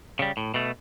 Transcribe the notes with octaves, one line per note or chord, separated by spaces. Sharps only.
C#3 G3
A2
B2 A3